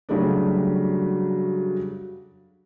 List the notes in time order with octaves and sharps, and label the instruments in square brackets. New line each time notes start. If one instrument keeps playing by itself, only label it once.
[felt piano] C#3 F#3 G3 A3 D4